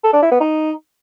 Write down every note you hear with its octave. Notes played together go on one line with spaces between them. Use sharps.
A4
D4
E4
B3
D#4